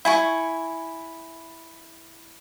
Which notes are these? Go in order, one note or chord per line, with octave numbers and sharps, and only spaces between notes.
E4 G#5 C#6